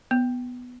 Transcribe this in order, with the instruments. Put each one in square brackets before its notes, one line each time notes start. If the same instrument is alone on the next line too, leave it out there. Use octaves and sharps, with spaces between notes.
[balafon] B3